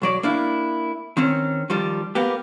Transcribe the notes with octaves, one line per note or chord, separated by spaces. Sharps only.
B1 F#3 D5
A#3 D4 E4
D#3 C4 C#4
D#3 F3 G3
A#3 B3 G4